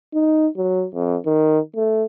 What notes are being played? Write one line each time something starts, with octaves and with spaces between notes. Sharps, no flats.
D#4
F#3
F2
D#3
A3